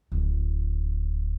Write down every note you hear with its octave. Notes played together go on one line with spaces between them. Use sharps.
D1